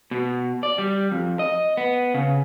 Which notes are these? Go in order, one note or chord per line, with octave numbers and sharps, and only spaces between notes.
B2
D5
G3
F2
D#5
B3
C#3